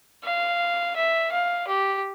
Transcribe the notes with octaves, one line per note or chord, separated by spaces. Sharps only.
F5
E5
F5
G4